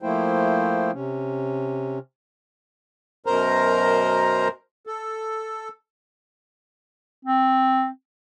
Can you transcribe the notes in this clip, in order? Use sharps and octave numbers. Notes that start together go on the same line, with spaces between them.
F3 A3 A#3 E4 C5 G5
C3 C#4
F#2 B2 A#4 C5 A#5
A4
C4